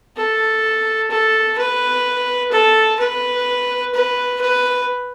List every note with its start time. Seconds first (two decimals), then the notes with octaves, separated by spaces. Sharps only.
0.16 A4
1.10 A4
1.58 B4
2.51 A4
2.99 B4
3.94 B4
4.41 B4